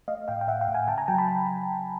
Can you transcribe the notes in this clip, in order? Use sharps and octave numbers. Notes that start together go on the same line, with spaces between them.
A3 D#5 F5
A2 F5 G5
G5
A2 E5 F#5
F5 G5
A2
F#5 G#5
C#3 G5 A5
G#5 A#5
F#3 G5 A5
A5 B5